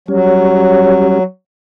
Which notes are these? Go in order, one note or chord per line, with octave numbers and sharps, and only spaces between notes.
F#3 G3 C#4